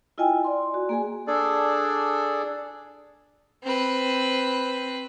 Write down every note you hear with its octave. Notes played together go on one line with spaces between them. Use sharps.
E4 F4 D#5 G5 G#5
D5 C6
F#4
A#3 G#4 G#5
D4 G#4 A4 D5
C4 B4